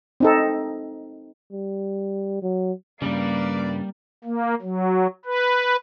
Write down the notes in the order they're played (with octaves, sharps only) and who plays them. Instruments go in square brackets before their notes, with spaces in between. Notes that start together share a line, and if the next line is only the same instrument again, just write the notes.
[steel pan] C4 D#4 A4
[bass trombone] G3
F#3
[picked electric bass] G2 C#3 [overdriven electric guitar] G3 [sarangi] A#3 [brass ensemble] B4 D5
[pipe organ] A#3
F#3
B4